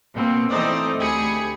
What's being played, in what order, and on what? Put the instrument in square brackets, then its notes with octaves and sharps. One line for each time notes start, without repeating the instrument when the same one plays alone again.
[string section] B2 A#3 C4
E3 A3 C4 D#4 C5 D5
D2 G4 G#4 B5 C#7